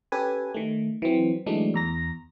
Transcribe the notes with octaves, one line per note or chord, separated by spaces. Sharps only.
C#4 G4 A4 B4 G#5
D#3 A3
E3 F#3 C4
E3 F#3 G#3 A3 D4 D#4
E2 A#5 A#6